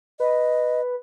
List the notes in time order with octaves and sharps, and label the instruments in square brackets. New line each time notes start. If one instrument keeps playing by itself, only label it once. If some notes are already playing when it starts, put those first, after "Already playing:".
[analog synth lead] B4 [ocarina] D#5